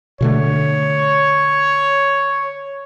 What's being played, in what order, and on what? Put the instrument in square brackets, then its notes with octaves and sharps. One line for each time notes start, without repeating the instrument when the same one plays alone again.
[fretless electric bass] B2 D3 A3 [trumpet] C#5